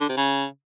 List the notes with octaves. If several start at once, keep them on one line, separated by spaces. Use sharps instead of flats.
D3
C3
C#3